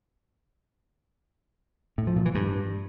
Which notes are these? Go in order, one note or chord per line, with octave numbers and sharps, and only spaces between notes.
A2
F3
A#2
E3
G2